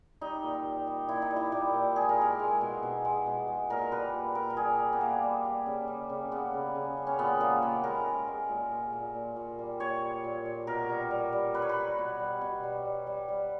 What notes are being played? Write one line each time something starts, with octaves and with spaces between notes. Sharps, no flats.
G3 D#4
A#2
G3
G3
A#2 E4
D#4
G3
E4
A#2 G4
A#2
G#3 G#4
A#4
G#3 G#4
G#3
B2
B2
G#3
B2
G#3
A#2 A#4
G3 B4
A#2
A#2 A#4
A#4
G3 G#4
G3
B3
G3 A#3
G3
G3
C#3
G3
C#3
C#3 B3
C#3
C#3
G3
C#4
A#2 B3
G#3 A#3
G#3 B3
G#3 A#4
G#3
G#3
A#2
A#2
A#2
A#2
A#2
G3
A#2 C#5
G3
A#2
A#2
B2 A#4
G3
G3
G3
G3 B4
C#5
B4
G3
B2
G3
B2
G3
G3
G3
G3